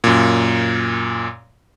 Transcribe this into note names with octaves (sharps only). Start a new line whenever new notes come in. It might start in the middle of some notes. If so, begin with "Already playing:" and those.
F#2 A#2